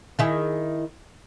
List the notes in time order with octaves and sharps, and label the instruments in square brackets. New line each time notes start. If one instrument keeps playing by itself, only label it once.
[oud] D#3 E4 G#4